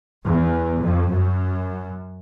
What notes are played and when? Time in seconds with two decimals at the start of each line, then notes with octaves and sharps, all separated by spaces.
0.24 E2
0.81 F2
1.09 F#2